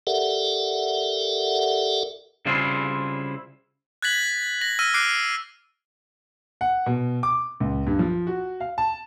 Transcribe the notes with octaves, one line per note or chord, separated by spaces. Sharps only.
G4 A4 A#4 D5 E5 F#5
C#3 G3 C4 E4 F4 G#4
F#6 G#6 A6 B6 F#7
A#6 F#7
E6 F6 A#6 D#7
D6 F6 F#6 C7 D7
F#5
B2
D6
C#2
G2
F3
F#4
F5
A5